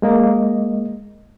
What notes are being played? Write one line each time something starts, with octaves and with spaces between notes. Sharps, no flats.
G#3 A#3 D#5